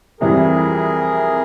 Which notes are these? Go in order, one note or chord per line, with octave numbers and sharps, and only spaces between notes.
F2 C3 E3 G3 G#4 A#4